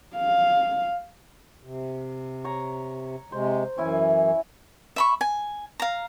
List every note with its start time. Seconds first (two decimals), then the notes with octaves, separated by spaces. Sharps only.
0.16 F5
1.63 C3
2.44 C#5 A#5
3.32 C3 G#3 C5
3.78 F#2 E3 C#4 E4 G#5
4.96 E5 B5 C#6
5.21 G#5
5.80 F5 A#5